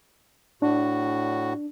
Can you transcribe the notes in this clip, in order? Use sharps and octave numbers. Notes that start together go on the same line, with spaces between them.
A2 D4 F#4